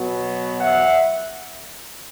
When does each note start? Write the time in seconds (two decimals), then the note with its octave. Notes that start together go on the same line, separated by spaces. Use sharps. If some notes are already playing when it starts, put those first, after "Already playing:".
Already playing: B2 F#3 B3
0.60 E5 F#5